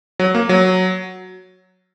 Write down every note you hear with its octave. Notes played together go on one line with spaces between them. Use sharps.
F#3
A#3
F#3